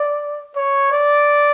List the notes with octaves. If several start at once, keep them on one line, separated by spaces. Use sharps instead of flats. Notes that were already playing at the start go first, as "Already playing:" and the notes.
Already playing: D5
C#5
D5